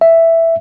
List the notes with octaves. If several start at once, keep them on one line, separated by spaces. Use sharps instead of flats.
E5